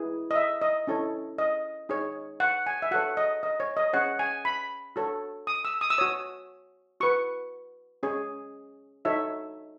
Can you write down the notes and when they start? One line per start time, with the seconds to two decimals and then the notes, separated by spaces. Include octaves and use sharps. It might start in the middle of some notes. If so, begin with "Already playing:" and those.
Already playing: E4 G#4 B4
0.31 D#5
0.36 E5
0.62 D#5
0.87 C#4 E4 A4 C#5
1.38 D#5
1.89 D#4 G#4 C#5
2.40 F#5
2.66 G#5
2.82 E5
2.91 F#4 A4 C#5 F#5
3.17 D#5
3.43 D#5
3.60 C#5
3.77 D#5
3.93 C#4 G#4 C#5 F#5
4.19 G#5
4.45 B5
4.96 F#4 A4 C#5
5.47 D#6
5.65 E6
5.81 D#6
5.90 E6
5.98 F#4 C#5 D#6
7.00 F#4 B4 C#6
8.03 C#4 G#4 C#5
9.05 D#4 F#4 A4 C#5 E5